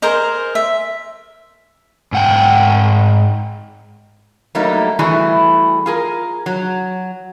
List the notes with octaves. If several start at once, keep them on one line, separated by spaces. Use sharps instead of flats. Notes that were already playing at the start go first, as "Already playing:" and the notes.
G#4 A#4 C5 D#5
E5
G#2 F#5 G5
F#3 G3 A3 A#3 D#4
E3 G3 A3 E4 F#4 G#4
F4 G#4 A#4
F#3